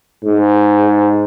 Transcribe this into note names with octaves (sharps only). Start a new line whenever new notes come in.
G#2